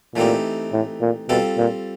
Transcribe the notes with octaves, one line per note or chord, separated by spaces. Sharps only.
A#2 E3 A3 C4 D#4 G4
A2
A#2
B2 G3 C4 F4 A4
A#2